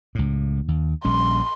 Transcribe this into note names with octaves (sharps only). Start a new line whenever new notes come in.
C#2 A2
D#2
A#1 G3 C#4 C6